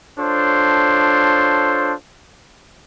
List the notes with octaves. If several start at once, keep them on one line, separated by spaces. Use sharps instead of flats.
D4 F4 A4 C5 C#5